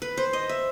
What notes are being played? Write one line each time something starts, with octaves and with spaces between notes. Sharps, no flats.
B4
C5
D#5
E5